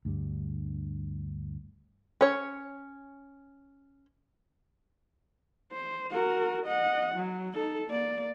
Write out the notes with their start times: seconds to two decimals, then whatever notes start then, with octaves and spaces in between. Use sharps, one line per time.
0.05 D2 G2 G3
2.21 C#4 C#5
5.72 C5
6.11 F#4 A#4
6.66 D#5 F#5
7.14 F#3
7.55 D#4 A4
7.87 A#3 D5